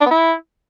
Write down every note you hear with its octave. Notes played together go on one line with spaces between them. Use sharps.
D4
B3
E4